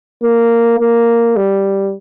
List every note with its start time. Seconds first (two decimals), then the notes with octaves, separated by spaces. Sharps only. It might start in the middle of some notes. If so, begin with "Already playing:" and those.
0.23 A#3
0.80 A#3
1.36 G3